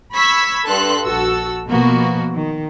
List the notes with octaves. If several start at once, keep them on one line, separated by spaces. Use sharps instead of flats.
B5 C#6 E6 G#6 B6
G2 A4 C6 F#6
A#1 F#4 A4 E6
B2 F3 A#3 B3 F#4
D#3